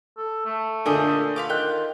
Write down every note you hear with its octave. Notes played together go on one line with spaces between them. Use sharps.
A4
A3
A#2 D3 G4 G#4 D#5
F4 B4 F5 D6
D#3 G5 F#6